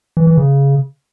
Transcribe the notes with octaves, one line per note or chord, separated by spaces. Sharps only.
E3
E3
C#3